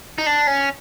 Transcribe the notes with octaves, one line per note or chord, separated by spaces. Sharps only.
D#4
D4
C#4